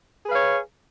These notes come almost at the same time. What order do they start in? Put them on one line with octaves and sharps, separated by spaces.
G#4 B4 F5 C#5